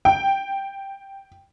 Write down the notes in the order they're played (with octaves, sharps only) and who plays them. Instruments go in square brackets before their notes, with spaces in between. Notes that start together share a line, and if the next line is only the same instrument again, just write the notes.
[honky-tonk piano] G5